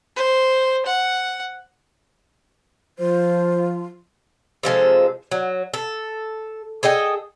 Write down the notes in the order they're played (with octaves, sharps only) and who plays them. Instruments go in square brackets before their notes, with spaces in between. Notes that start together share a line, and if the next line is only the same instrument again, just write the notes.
[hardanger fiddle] C5
F#5
[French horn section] F3 [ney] F4 [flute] C5
[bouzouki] C3 F3 G#3 A4
F#3
A4
G#4 A4 D#5 G5